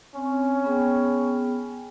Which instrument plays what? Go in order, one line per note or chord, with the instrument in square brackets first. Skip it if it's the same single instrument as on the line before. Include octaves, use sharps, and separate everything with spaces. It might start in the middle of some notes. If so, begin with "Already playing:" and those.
[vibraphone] C4 [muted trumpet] C#4
[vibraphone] B3 G#4 G5